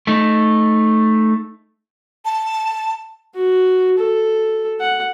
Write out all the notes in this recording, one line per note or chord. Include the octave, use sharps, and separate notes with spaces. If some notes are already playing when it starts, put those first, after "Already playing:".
A3 D#4
A5
F#4
A4
F#5